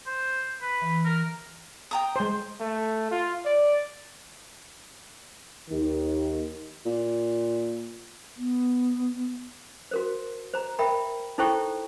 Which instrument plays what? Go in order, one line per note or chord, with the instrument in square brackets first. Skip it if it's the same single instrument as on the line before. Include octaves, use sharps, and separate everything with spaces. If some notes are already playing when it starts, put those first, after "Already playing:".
[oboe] C5
B4
[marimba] E3
[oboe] A#4
[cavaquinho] G5 A#5 D#6
[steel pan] G#3 C5
[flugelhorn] A3
F4
D5
[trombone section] D#2 D#3
[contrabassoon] A#2
[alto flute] B3
[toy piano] F#4 A#4 C5
C5 A#5
A#4 E5 G5 B5
D#4 E4 A4 C5 G5 C#6